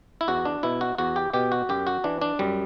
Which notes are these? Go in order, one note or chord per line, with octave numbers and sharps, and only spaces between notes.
E4
E2 F#4
D4
B2 E4
F#4
E2 F#4
G4
B2 G4
F#4
F#2 G4
F#4
E3 D4
D4
F#2 G3